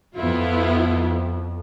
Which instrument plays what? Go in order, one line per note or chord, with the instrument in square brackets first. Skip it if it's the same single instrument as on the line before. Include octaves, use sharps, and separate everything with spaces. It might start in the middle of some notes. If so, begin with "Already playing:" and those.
[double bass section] F2 [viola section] B3 E4 F4